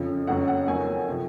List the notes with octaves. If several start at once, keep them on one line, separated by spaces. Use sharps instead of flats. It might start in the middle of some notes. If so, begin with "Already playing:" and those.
Already playing: F2 C#3 F3
F2 C#3 F#3 F#5
F#5
F2 D#3 F#3 G#5
C3 F3